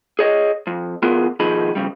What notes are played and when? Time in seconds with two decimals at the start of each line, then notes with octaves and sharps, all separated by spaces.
0.19 G#4 C#5 D#5
0.67 F2
1.02 E2 B3 F4 G#4 A#4
1.40 B2 D#3 F3 D#4 G#4 B5
1.75 F2 C#3 G3